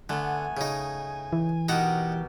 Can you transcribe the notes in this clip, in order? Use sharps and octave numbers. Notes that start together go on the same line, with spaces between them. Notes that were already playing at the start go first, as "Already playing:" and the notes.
D3 A3 B3 G#5
C#3 D#4
E3
B2 D#4 F#4 G4 A#4 F#5